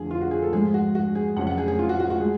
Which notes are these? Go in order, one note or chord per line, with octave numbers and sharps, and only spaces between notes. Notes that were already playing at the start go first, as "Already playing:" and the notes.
Already playing: F2 D3 F3 G#4
F4
F#4
G#4
A4
G#2 F3 G#3 G#4
F#4
F#4
G#4
F2 C#3 F#3 F#5
F#5
G#4
G#4
F4
F#4
F#4
F#4
G#3 G#4